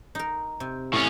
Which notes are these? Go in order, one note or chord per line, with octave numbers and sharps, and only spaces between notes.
D#4 A#4
C3
A2 C#4